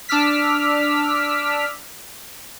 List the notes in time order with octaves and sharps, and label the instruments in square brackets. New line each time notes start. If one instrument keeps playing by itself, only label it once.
[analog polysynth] D4 D6 E6 F6 B6